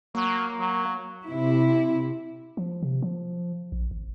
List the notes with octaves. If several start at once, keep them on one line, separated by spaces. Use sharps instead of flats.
F#3 A#3
F#3
C3 E4
F3
C3
F3
A#1
G#1